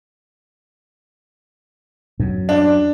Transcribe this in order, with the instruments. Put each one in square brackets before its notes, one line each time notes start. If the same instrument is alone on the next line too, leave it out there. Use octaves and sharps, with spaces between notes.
[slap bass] F#2
[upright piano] D4